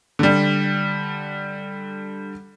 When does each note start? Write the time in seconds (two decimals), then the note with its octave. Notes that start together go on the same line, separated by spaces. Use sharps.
0.19 D3 G3